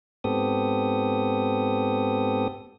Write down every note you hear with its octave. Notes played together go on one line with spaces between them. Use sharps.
G#2 B3 C4 G4 A4 D#6